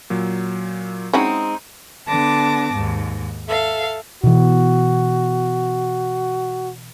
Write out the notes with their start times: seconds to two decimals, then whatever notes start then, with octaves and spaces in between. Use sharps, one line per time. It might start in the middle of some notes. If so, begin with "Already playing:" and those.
0.10 A#2 F#3
1.13 G#3 C4 C#4 D#4 E4 F#4
2.07 D3 B3 A5 D6 A#6
2.73 D#2 G#2
3.48 A4 E5 F5
4.24 B2 E3 F#4